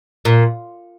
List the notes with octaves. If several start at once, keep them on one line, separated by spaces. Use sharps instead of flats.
A#2